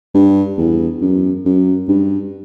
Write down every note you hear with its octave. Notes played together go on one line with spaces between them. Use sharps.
G2
E2
F#2
F#2
G2